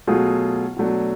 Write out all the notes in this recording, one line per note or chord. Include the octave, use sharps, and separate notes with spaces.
B2 F#3 A3 F4 G#4
B2 F#3 A3 D4